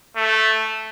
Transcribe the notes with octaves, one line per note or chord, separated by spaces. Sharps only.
A3